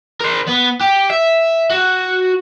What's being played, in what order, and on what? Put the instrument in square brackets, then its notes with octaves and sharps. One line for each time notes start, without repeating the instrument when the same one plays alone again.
[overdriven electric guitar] A#4 C5
B3
G4
E5
F#4